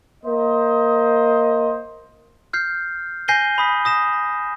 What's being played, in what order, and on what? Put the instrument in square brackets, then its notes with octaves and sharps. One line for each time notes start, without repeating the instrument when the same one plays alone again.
[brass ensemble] A#3 C5 D#5
[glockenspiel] F6 G6 C7
G#5 G6 A#6 C7 D#7 G7
B5 D#6 B6
D#6 A#6 E7